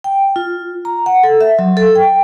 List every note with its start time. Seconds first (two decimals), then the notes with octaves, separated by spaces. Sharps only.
0.04 G5
0.36 F4
0.85 A#5
1.06 F#5
1.23 A4
1.41 E5
1.59 F#3
1.77 A4
1.95 G5